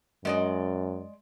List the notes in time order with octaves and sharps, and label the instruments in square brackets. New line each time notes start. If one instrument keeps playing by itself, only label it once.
[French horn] F#2 [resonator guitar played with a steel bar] G#3 D5 D#5